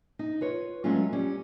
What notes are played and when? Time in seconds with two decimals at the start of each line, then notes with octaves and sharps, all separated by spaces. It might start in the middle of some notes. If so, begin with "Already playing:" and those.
0.19 D#4
0.41 F4 B4 C#5
0.84 F#3 G#3 A3 C#4 F4
1.13 G3 C#4